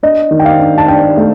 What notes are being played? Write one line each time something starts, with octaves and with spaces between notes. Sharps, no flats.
D4 D#5
D#3
G5
F5
D4
A5
D4 G5
A3